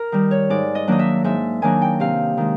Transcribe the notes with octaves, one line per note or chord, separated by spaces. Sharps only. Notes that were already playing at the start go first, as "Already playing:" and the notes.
Already playing: A#4
D#3 G3
C#5
G#2 D5
D#5
D#3 F#3 A#3 D4 D#5
E5
G#2 E5
D#3 F#3 A#3 D4 G#5
G5
C3 F5
D#3 G#3